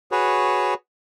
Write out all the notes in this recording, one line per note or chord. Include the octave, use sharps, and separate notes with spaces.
F#4 G#4 B4 C#5